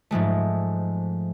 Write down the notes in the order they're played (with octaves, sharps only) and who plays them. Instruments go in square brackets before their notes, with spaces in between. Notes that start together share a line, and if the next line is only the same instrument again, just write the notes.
[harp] G#2 F3 G#3 A3